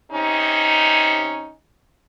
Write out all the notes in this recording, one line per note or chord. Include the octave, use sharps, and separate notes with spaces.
C3 C#4 D#4